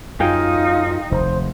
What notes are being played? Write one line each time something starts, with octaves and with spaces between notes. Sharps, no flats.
F#2 D#4 F4 G#4 F5 G5
F1 D#2 C5